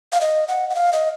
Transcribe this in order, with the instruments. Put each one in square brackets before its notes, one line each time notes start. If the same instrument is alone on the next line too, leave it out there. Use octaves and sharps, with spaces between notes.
[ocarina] F5
D#5
F#5
F#5
F5
D#5